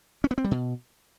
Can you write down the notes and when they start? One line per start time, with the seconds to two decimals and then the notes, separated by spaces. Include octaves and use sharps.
0.24 C#4
0.31 B3
0.38 C4
0.44 G3
0.51 B2